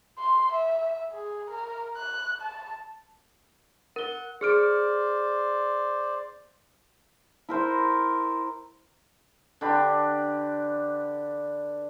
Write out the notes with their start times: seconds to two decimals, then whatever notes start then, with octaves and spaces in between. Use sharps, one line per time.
0.19 C6
0.52 E5
1.12 G#4
1.50 A#4
1.96 F#6
2.40 A5
3.96 A#4 F#5 G7
4.41 G#4 C5 D5 F6 D7
7.49 E4 A#4 C5
9.61 D3 D4 G4 B4